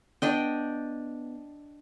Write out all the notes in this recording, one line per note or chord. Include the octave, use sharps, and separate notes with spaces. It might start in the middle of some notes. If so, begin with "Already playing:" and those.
B3 D4 D#5 G5